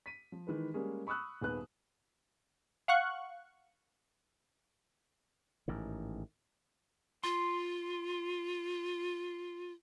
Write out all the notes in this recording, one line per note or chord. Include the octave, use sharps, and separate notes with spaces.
B6 D#7
F3
D#3 E3 G#3 B4
G3 G#3 A#3 C#4 G#4
B5 C#6 D#6 E6 F#6
D#1 D#3 B3 G#4 B4 F#6
F5 F#5 C#6 F#6
A1 G#2 D#3
F4 C6